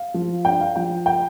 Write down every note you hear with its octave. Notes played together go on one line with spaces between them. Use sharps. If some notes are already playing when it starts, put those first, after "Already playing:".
Already playing: F5
F3
D4 G5
F5
F3 G5
G5